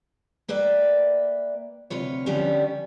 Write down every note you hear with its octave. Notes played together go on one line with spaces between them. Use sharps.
A#3 B4 D5 E5 G5
D2 C3 F4 B4 C#5
D3 F3 G3 B3 C#4 G4